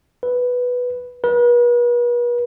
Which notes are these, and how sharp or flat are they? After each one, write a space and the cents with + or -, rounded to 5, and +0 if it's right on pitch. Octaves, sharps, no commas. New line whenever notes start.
B4 +0
B4 -40